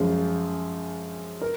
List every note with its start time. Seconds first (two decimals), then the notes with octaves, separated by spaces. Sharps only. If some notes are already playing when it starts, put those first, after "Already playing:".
Already playing: F#2 F3 G#3
1.41 A#4